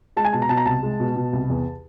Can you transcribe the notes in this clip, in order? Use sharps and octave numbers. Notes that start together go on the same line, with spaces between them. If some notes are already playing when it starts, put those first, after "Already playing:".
G#3 A5
G#5
B2 A5
A#5
B2 A5
A#5
C2 A5
G#3
B2
B2
C2
E2